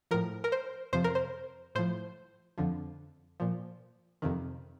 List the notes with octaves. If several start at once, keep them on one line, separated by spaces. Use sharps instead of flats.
A2 F3 A#4
A#4
C5
F2 C3 F3 C5
A#4
C5
A2 F3 C5
F2 D3 F3
A#2 F3
F2 C3 D#3